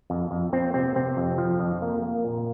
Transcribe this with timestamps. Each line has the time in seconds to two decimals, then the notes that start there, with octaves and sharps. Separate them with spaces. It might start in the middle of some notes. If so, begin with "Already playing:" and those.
0.10 F2
0.31 F2
0.53 F2 C4
0.74 C3 C4
0.96 C3 C4
1.17 F2
1.38 F3
1.60 F2
1.82 A#3
2.03 A#3
2.25 A#2